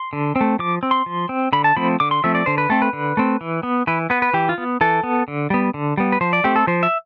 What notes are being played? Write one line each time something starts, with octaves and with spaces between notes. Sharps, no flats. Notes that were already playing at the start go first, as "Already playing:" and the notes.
Already playing: C6
D3
C4
A3
F3 D6
C4
C6
F3
C4
D3 B5
A5
F3 A3 C4 B5
D3 D6
C6
F3 A3 C4 E5
D5
D3 C5
B4
A3 C4 A4
B4
D3
A3 C4
E3
B3
E3 B4
B3 B4
B4
E3 G4
F4
B3
E3 A4
B3
D3
G3 B3
D3
G3 B3
B4
F3 C5
D5
A3 C4 G4
A4
F3 C5
E5